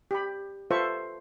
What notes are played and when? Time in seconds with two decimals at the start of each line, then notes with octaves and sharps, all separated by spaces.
0.11 G4 B5
0.71 F4 A4 B4 C5 E5 C#6